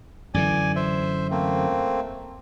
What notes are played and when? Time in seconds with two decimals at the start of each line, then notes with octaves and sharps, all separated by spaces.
0.34 F#2 D3 E3 D5 G#5
0.76 C5 E5
1.31 A3 A#3 C4